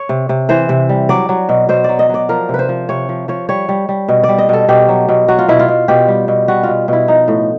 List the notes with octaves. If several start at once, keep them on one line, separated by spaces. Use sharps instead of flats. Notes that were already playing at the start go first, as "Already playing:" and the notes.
Already playing: C#5
C3
C3
E3 C5
C3
G3
F#3 D5
F#3
B2
B2 C5
F#3 D5
D#5
F#3 D5
F3 A#4
C3
B4 C5
F3
C3 C#5
F3
F3 C#5
G3 C#5
G3
G3
B2
D5
G3
D#5
B2 A4
B2 G4
F#3
B2
F#3 F#4
F4
B2 E4
F4
B2
B2 G4
G3
B2
G3 F#4
B2 F4
B2 E4
F3 D#4
A2